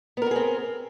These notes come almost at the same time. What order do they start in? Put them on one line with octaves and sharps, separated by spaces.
B3 A#4 F#4 G#4 C4